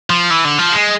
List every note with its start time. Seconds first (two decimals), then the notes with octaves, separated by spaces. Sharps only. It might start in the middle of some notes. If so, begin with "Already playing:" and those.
0.10 F3
0.30 E3
0.45 D3
0.58 F3
0.72 G#3